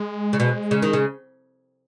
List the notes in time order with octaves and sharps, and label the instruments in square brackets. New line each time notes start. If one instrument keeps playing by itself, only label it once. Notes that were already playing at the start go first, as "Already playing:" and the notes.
Already playing: [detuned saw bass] G#3
[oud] C#3
B2
C#3
D#3
C#3